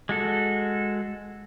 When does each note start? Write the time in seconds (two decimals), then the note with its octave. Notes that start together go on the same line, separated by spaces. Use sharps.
0.09 G#3 F#4 A4